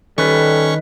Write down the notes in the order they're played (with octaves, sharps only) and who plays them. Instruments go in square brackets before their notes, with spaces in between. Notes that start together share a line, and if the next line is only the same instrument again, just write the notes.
[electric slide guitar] D#3 B4 [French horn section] G3 A4 [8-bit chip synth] C#4 C#6